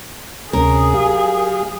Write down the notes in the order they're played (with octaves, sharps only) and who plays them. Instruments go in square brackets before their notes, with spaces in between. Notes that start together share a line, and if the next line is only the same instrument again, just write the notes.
[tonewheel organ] D2 C3 C#4 [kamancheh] G#4 [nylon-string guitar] A#4
[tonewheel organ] F#3 G4 F5